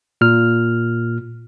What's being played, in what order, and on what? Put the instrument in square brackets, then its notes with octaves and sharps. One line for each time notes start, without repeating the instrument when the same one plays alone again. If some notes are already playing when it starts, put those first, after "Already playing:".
[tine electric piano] A#2 F6